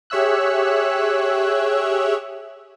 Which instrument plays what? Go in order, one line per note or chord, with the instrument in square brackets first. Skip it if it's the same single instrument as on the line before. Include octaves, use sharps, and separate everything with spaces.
[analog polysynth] G4 G#4 C#5 E5 E6 F#6